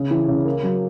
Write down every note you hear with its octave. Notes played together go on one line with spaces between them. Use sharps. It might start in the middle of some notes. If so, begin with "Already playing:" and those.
Already playing: C#3
E3
C#3
A#3
F#3